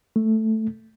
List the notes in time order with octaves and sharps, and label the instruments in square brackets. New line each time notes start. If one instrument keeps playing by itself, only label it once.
[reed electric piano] A3